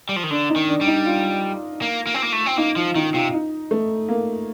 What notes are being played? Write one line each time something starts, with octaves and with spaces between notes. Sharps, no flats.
G3
F3
D#3
D3 D4
D#4
D#3
D4
G3
D#4
F4
A#3
A#3
C4
A#3
A3
C4
A#3 D#4
F3 F4
D#3 D#4
C3 F4
D#4
A3
A#3